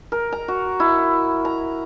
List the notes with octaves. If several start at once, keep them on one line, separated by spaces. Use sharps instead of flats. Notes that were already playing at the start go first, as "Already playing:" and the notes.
A#4
A#5
F#4
E4
A#5